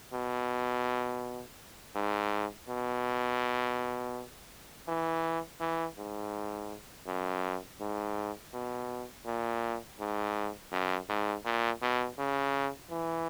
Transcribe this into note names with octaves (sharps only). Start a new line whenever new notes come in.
B2
G#2
B2
E3
E3
G#2
F#2
G#2
B2
A#2
G#2
F#2
G#2
A#2
B2
C#3
E3